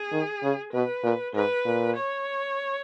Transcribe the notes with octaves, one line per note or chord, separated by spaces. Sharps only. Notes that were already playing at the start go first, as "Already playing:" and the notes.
Already playing: G#4
D#3
C#3
B2 B4
A#2
G#2 B4
A#2
C#5